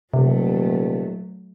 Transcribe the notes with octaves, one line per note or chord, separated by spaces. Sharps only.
D#1 C3 F#3 A3